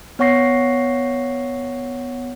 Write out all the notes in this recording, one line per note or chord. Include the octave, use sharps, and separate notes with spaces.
B3 C#5 F#5 C#6 A#6 C7